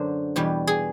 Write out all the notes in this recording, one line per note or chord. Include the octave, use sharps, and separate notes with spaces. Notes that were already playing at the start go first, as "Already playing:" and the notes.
Already playing: F#2 D3 F#3 C5
E2 B2 G3
G#4